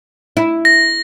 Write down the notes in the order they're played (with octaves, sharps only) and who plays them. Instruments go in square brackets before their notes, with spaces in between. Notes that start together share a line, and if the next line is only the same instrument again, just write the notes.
[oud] E4
[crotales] A#6